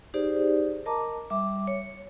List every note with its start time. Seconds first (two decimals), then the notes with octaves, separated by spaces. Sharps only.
0.14 D#4 G4 G#4 C5 D5
0.86 A#4 D#5 A5 A#5 D6
1.30 G3 E5 D6
1.67 C#5